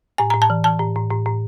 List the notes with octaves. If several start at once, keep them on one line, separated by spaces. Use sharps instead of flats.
A2 G#5
A2 A#5
A5
E3
E3 A5
A2
A2
A2
A2